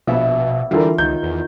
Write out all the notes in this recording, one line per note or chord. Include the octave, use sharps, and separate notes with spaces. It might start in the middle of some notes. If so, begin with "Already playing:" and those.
A#1 B2 B3 E5
D3 E3 G3 F4 A#4
C#2 D#3 G6
E2